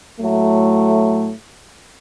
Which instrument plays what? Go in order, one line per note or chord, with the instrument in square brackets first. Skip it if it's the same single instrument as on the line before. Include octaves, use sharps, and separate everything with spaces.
[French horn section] A2 F#3 A3